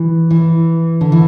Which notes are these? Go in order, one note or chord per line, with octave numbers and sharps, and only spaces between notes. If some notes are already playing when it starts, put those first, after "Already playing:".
Already playing: E3
E3
D3
E3